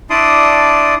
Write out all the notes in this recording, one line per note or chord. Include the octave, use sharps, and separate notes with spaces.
D4 E4 D5 A5 C6 D#6